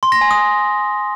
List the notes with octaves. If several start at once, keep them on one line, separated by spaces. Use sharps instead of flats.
C6
A#6
G#5
D#6